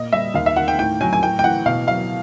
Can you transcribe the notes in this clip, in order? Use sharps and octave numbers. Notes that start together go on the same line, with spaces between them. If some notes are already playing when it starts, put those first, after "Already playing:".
Already playing: A#2 D#5
G3 E5
D#2 F5
E5
D#3 F#5
G5
A2 G5
F#3 G#5
G#5
A2 G5
G5
E3 F#5
B2 F5
F#3 F5